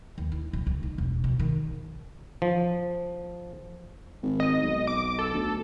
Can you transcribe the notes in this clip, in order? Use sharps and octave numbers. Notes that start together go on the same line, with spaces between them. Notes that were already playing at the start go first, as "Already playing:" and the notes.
D#2
E4
D1
C#2
D#4
E1
B2
D#3
F3
G#1
D#5
B1
D6
A4
D2